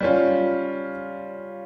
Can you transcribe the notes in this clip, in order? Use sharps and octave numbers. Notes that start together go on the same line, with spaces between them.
G3 C#4 F4